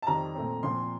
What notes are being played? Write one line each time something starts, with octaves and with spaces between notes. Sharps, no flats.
A5
F2 D#3 G3 C4 A#5
A#2 A3 C4
A#2 F3 C4 C6